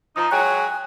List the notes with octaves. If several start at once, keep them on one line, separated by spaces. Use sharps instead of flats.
F3 D#4 A#5 D#6
F#3 G#3 C#5 G5 G#5 F#6